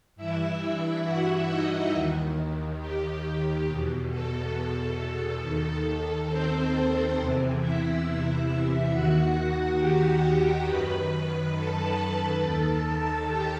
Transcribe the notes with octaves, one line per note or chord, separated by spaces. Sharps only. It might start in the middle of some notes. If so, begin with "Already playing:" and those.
G2 E3 E4 E5
F#4 F#5
D#4 D#5
D#2 D#3
G4
E2 B2
A4
A4
D#2 D#3
C4 C5
E2 C3 E3
E4 E5
D#2 D#3 F#4 F#5
G4 G5
F#2 D#3 B4 B5
A4 A5
D#2 D#3
G4 G5